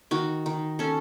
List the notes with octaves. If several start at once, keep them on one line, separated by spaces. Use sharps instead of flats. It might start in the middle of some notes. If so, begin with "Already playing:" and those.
D#3 F#4
D#3
C#4 A4